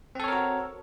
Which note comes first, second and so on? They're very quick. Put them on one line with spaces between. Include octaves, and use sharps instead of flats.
C4 A4 C#5 A#4 F#4